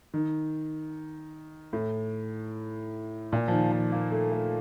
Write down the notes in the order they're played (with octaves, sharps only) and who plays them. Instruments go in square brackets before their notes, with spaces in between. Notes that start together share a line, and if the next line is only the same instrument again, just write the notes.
[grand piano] D#3
A2
A#2
F3
D#3
F3
A#3
A3
A3